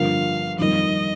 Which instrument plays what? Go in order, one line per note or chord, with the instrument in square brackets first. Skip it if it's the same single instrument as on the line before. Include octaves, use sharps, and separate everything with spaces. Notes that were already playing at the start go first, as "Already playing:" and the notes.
Already playing: [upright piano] G2 D3 F3 A#3 [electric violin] F5
[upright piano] F2 D#3 G3 A#3 [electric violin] D#5